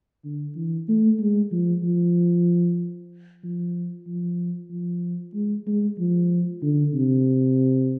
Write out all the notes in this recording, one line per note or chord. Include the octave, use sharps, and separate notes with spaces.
D3
E3
A3
G#3
F3
F3
F3
F3
F3
G#3
G#3
F3
D3
C3